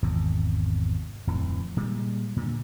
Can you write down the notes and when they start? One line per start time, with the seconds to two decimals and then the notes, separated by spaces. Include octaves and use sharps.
0.02 G#1 E2 C3
1.27 D1 F2 E3
1.77 A#2 G3 G#3
2.37 A#2 D3